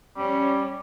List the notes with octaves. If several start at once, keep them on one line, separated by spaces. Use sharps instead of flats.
G3 C#4